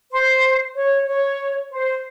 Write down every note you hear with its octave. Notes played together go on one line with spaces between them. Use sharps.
C5
C#5
C#5
C5